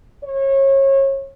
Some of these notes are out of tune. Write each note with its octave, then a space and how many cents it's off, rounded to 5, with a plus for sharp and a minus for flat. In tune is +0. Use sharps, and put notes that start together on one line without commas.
C#5 -30